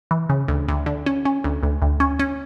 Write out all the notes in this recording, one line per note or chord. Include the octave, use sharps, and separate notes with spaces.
E3
C#3
D2
D2
D3
C#4
C#4
D2
D2
D2
C#4
C#4